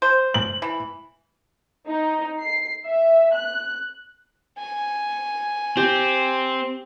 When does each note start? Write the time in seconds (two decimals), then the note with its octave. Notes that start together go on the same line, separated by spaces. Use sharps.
0.02 C5
0.34 F#7
0.62 E3
1.88 D#4
2.41 C7
2.85 E5
3.33 F#6
4.58 G#5
5.77 C4 G4